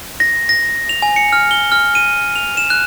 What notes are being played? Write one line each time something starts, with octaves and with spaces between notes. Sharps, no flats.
A#6
A#6
F7
G#5
C#7
F6
G7
F6
D#7
F7
E7
F#6